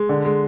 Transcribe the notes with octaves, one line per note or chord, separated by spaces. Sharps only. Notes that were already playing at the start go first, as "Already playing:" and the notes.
Already playing: G#3
D3
G#3